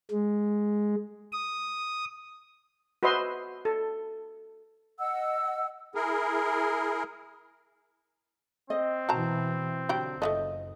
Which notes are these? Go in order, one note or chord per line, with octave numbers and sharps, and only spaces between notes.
G#3
D#6
F#4 B4 C5 D#5 E5 C6
A4
D#5 F#5 E6
E4 G#4 A#4
C4 D#5
B2 E3 F#4 A5 A#5
D3 F#3 G3 G5
F#1 F3 G3 A3 D#5